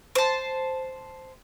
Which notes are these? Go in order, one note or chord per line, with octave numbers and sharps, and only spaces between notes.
C5 A5